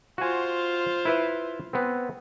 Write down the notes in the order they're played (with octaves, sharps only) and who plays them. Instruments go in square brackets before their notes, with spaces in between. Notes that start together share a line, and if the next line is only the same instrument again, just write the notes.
[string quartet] F4 C5 [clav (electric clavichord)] F#4 G#5
[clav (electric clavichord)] E4 B4 E5
B3 C4